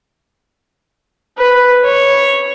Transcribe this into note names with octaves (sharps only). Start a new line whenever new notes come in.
B4
C#5